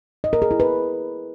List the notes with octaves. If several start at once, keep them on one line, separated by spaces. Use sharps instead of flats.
D#5
A#4
G#4
E4
B4